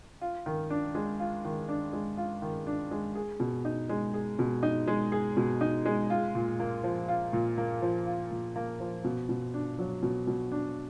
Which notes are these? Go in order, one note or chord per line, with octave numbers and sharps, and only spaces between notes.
F4
D#3
D4
G#3
F4
D#3
D4
G#3
F4
D#3
D4
G#3
G#4
B2
D#4
G#3
G#4
B2
D#4
G#3
G#4
B2
D#4
G#3
F4
A#2
A#3
F3
F4
A#2
A#3
F3
F4
A#2
A#3
F3
B2
B2
D4
F#3
B2
B2
D4